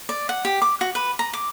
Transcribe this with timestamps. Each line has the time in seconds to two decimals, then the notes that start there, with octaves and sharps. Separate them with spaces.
0.09 D5
0.29 F#5
0.45 G4
0.62 D6
0.81 F#4
0.95 B4
1.19 A#5
1.33 D6